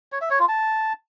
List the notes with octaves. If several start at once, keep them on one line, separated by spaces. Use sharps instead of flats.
C#5
E5
C#5
F4
A5